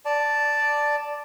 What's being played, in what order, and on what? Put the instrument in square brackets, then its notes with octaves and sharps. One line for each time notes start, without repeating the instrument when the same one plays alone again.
[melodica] D5 A5